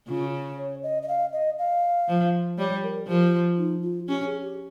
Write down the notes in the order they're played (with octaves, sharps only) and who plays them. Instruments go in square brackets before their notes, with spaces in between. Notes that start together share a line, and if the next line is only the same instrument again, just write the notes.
[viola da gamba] C#3 [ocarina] F4
[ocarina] C#5
D#5
D#5
F5
D#5
F5
[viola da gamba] F3
[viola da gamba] G3 [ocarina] C#5
[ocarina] A#4
[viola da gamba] F3 [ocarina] G4
[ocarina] D#4
F4
[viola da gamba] C#4 [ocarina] G4
[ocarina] G#4
G4